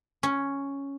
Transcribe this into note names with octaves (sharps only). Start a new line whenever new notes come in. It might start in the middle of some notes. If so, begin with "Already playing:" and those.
C#4